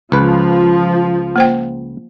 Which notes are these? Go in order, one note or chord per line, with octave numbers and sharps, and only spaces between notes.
C#2 F3 B4
A#3 C5 G5